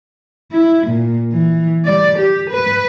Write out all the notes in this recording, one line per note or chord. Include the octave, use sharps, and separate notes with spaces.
E4
A#2
E3
G3 D5
G4
B4